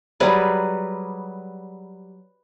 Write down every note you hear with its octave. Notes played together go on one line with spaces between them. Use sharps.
F#3 G3 G#4 B4